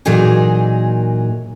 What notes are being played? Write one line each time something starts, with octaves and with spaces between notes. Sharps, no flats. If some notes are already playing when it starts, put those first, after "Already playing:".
A#2 E3 F#3 D#4 G#4 A#4